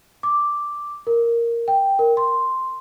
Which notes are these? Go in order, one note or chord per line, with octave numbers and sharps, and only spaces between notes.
D6
A#4
G5
A#4
C6